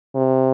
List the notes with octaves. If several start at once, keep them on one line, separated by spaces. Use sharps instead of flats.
C3